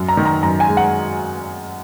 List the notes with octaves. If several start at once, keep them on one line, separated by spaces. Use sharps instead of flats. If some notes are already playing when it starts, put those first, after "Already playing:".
Already playing: F#2
A#5
D#3
A#5
F#2 A#5
G#5
G#3
F#5